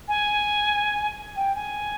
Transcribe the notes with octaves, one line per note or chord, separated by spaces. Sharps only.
G#5
G5
G#5